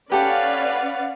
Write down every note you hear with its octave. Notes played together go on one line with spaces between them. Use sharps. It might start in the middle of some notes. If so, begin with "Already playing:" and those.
C#4 G4 A4 B4 D5 F5 F#5